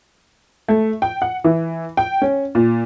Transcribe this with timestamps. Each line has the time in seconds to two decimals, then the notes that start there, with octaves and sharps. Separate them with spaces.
0.68 A3
1.02 G5
1.22 F#5
1.44 E3
1.97 G5
2.22 C#4
2.55 A#2